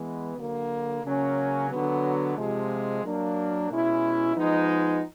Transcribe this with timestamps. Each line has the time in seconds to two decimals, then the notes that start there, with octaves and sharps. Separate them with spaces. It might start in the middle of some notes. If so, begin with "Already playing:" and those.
Already playing: E3 G#3 B3
0.36 D3 F#3 A#3
1.03 C#3 F#3 A#3 C#4
1.69 D3 F#3 B3
2.36 C3 F3 G#3
3.03 F#3 A#3 D4
3.69 B2 G#3 C#4 E4
4.35 F3 G#3 B3 D#4